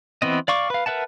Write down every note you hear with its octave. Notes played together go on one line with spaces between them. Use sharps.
E3 B3 C4 D#5
D5 F5 C#6 D6
B4 F5
A#4 B4 E5 F#5 A5